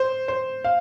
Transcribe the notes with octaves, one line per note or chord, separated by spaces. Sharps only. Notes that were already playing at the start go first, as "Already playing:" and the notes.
Already playing: C5
C5
F5